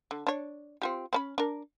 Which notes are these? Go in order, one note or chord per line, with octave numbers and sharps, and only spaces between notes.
D3
D4 C#5
C4 F4 G4
C4 C#4 B5
D4 A#4